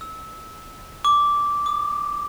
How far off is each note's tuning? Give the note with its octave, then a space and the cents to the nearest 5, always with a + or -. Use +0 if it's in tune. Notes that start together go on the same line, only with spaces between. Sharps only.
E6 -20
D6 -10
D6 +45